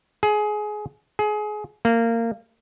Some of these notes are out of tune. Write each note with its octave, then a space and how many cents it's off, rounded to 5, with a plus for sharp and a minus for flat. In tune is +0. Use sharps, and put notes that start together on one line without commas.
G#4 +20
G#4 +25
A#3 -20